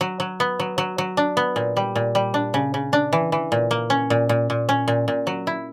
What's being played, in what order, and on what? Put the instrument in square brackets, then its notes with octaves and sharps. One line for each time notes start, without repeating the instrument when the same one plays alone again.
[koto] F#3
F#3
B3
F#3
F#3
F#3
D4
B3
A#2
G3
A#2
G3
D4
C#3
C#3
D4
E3
E3
A#2
A#3
C#4
A#2
A#2
A#2
C#4
A#2
A#2
F#3
E4